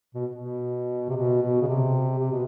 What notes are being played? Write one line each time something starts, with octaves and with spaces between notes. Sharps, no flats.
B2
B2
C3
B2
B2
C#3
C3
C3
B2